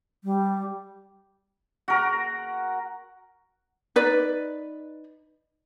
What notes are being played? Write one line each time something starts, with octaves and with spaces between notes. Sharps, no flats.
G3
F#4 A#4
D#4 B4 D5